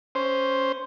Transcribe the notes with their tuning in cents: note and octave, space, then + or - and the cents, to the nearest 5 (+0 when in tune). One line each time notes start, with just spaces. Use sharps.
C#4 +0 C5 +0